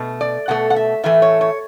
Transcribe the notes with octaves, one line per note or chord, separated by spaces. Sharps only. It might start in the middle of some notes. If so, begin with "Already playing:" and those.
Already playing: B2 A3
D5
B2 A3 F#5
F#5
E5
A2 E3 A3 E5
C#5
C#5